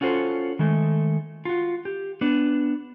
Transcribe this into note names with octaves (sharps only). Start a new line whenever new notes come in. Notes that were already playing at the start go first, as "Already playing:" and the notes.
C#4 F4 F#4 A4 C5
D#3 G#3 A3
F4 F#4
G4
B3 D4